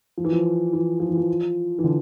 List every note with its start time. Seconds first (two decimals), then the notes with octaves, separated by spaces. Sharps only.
0.18 F3
0.25 E3
0.32 F3
0.73 E3
1.00 F3
1.09 E3
1.17 F3
1.79 E3
1.84 D3